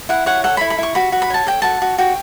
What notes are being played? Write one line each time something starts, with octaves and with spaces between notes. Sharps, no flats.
E4 F#5
C#5 F#5
A4 F#5
E4 B5
B5
E4 C#6
F#4 B5
F#4
B5
C#5 A5
A4 G5
F#4 A5
F#4
F#4 G5